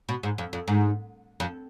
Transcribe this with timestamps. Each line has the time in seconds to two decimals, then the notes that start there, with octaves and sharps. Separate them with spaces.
0.09 B2
0.23 G#2
0.38 F2
0.53 F2
0.68 G#2
1.40 F2